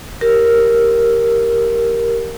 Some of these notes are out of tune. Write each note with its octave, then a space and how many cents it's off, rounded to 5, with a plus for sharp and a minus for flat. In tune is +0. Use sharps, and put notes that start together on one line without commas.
G4 +0 A#4 +0